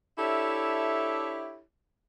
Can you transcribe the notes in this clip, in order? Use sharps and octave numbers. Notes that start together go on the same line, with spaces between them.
D4 E4 G4 A4 C#5 E5